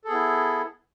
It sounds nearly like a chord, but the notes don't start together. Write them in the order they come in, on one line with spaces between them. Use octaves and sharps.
A4 G#4 B3 E4